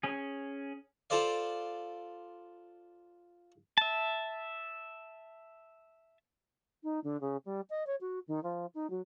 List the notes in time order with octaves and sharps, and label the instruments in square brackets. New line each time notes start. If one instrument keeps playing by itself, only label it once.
[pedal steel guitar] C#4 G#4
[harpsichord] F4 A4 C5 D5 F5
[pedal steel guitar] E5 A5
[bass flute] D#4
D3
C#3
G3
D#5
C#5
F#4
D#3
F3
D#4
F#3